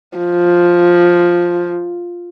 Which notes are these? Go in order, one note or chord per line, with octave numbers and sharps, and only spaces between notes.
F3